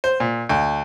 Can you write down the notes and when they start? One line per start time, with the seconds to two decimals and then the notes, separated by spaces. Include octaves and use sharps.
0.04 C5
0.20 A#2
0.49 D2